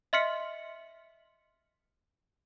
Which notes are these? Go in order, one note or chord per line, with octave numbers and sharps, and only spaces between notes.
D#5 E5 C6 F6 B6 C#7